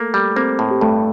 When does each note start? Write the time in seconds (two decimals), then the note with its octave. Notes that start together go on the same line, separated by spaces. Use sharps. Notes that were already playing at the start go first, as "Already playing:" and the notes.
Already playing: A3 A#3 A4
0.14 G3
0.36 A#3 C4 C5
0.59 A2
0.71 G4
0.81 G2 A3 A4